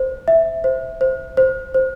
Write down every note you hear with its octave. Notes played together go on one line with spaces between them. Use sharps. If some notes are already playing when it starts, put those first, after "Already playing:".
Already playing: C5
E5
C5
C5
C5
C5